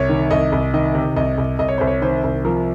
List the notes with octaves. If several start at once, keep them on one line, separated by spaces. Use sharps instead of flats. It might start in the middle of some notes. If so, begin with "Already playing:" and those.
Already playing: C2 C#5
D#3
C2 D#5
C2
D#3 D#5
C3
C2 D#5
C2
C2 D#5
C#5
C2 C5
C#5
D#3 C5
C2
F3 A#4